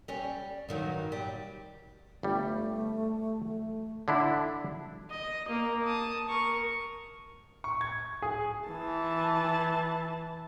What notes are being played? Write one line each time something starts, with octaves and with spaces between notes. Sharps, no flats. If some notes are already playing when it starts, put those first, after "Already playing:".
G3 C#4
G2 D#3 F#3
G3
G1 G3 A3
D3 D4 E4
D#5
A#3
A5 D#6
A#4 C#6
C#6
G#6
G#4
E3 A5